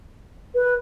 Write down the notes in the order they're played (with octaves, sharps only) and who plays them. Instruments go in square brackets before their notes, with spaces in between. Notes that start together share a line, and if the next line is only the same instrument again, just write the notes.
[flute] B4